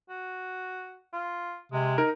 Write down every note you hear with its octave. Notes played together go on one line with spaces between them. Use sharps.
F#4
F4
C3 G#3
D#4 A#4